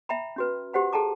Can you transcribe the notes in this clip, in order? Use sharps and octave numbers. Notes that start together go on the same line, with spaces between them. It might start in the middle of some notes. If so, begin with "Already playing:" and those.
E5 G5 A#5 B5
C#4 F#4 B4
F#4 G4 C5 F#5 B5
G#4 A4 G5 A5 A#5 D6